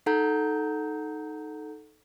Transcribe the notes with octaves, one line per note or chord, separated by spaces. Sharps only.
D#4 A4 F#5 A#5 G6